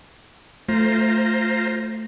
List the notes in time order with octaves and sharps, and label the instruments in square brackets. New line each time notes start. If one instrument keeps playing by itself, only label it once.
[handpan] A3 [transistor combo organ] F4 C5 A#5